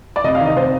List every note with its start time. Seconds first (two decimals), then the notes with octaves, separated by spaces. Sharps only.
0.16 D5
0.24 C3 D#5
0.35 F5
0.41 D#3
0.46 D#5
0.56 C3 C5